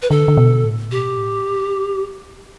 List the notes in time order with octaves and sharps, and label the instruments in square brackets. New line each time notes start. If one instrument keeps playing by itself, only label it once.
[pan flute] B4
[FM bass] D3 [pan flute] A4
[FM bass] D3
B2
A2
[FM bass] B2 [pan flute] G4
[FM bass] A2